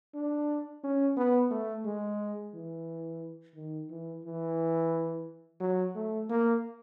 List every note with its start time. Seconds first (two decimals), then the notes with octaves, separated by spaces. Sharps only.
0.15 D4
0.84 C#4
1.17 B3
1.51 A3
1.85 G#3
2.54 E3
3.55 D#3
3.90 E3
4.25 E3
5.60 F#3
5.95 A3
6.30 A#3